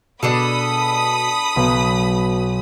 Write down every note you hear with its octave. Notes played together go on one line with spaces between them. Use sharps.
B2 D4 G#4 A4 B5 D#6
B1 F#3 B3